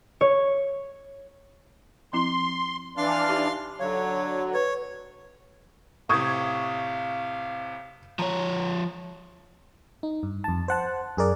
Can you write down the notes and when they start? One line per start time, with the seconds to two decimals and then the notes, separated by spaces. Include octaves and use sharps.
0.21 C#5
2.13 F3 C4 E4 C6
2.97 E3 D4 F5 C6 F6
3.28 D#4 G4 A5
3.80 D3 F#3 C#5 F5
4.54 B4 C#5
6.09 A2 C3 F5 C#6 D#6 G#6
8.19 F3 C#5 A#5
10.03 D#4
10.23 G2
10.44 F2 A5
10.68 C5 F#5 A5
11.17 F#2 G#4 A#4 D5